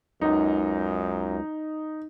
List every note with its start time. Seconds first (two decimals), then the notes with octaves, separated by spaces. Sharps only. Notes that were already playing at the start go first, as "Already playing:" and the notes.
0.21 C#2 F#2 D#4